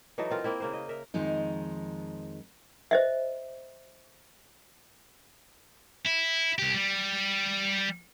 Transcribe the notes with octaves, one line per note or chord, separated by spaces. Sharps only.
E3 F#3 D#4 A4
C4 F4 A#4
A#3 C4 E4
C#3 A#3 C5
D#5
A#4 E5
F2 D#3 F3 G#3 D#4
C5 D#5 E5
E4
C2 G4
G3